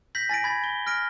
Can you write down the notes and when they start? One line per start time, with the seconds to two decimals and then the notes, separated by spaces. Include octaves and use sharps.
0.15 G6 A#6 B6 F#7
0.29 G#5 A6 A#6 D7
0.44 B5 G#6 A6
0.64 G7
0.87 F6 A#6 D7